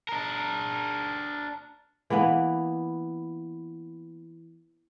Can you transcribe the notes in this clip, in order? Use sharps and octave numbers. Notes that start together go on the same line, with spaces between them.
D4 A#4
E3 A#3 B3 B4